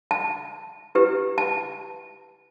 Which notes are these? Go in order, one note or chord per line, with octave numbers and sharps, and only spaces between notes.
A5
E4 G4 B4
A5